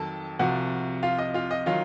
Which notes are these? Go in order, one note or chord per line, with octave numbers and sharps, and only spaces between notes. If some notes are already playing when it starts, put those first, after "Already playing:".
Already playing: F2 D#3 F#3 A4 A5
C2 C3 F3 F#4 F#5
F4 F5
D#5
F4 F5
D#5
D#3 F#3 F4 F5